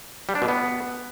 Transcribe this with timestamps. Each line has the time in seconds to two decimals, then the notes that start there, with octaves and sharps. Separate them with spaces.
0.29 G3
0.35 D4
0.42 B2
0.48 B3